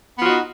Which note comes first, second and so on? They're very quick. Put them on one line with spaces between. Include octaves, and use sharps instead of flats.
B3 F4 F#4 D#4